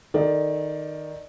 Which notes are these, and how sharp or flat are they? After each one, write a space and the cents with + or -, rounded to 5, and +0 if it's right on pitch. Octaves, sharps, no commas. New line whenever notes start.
D#3 +0 A4 +0 D5 +10